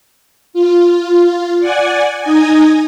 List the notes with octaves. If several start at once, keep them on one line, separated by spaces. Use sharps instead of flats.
F4
D5 F#5 G#5
D#4 D#5 G#5